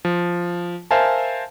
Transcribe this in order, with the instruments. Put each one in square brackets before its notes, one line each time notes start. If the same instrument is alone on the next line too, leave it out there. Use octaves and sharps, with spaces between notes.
[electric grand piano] F3
A#4 C5 E5 F5 G#5 A5